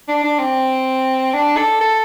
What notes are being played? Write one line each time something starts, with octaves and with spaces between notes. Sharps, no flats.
D4
D4
C4
D4
A4
A4